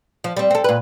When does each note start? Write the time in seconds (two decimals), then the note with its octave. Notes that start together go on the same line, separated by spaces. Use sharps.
0.24 F3
0.37 G3 C4
0.51 C4 A4
0.64 A#2 B4